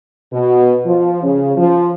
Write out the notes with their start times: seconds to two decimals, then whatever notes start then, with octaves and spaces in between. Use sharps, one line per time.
0.32 B2
0.85 F3
1.23 C#3
1.56 F3